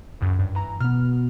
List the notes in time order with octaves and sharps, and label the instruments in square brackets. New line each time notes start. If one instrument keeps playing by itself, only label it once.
[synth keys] C#2 F#2
G2
E3 A#5
[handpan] B2 [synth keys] B3 F6